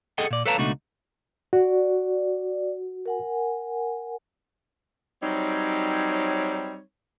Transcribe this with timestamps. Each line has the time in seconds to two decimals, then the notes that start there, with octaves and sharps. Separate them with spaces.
0.18 G#4 A4 D#5 F#5 G5
0.31 A#2 D5
0.46 A4 B4 C#5 F5 A5 A#5
0.58 C#2 B2 A3 D4 D#4 F#4
1.53 F#4 D5
3.06 A#4 F#5 G#5
5.23 F#3 G3 C4 D#4 C#5